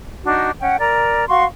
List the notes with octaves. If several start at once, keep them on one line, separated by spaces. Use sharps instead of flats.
D4 D#4 F#4
C#4 F#5 G5
A#4 D5 A#5
F#4 F5 C6 C#6